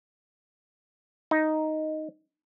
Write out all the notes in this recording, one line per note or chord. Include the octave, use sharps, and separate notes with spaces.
D#4